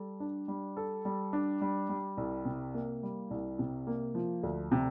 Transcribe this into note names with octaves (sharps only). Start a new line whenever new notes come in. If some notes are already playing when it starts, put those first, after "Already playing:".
Already playing: G3 A4
D4
G3
A4
G3
D4
G3
G3
C2
C3
A#3
G3
C2
C3
A#3
F3
D2
C3